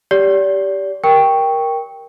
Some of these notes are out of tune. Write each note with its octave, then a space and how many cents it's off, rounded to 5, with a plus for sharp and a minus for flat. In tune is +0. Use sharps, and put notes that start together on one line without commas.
G4 +0 D5 -35
A#4 +10 G5 +5 C#6 +0